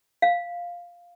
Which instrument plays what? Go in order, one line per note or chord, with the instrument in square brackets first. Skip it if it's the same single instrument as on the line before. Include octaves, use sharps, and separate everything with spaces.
[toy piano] F5